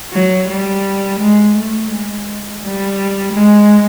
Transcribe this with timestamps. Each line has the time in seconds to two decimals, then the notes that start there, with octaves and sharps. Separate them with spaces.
0.12 F#3
0.48 G3
1.20 G#3
1.55 A3
1.90 G#3
2.62 G3
3.33 G#3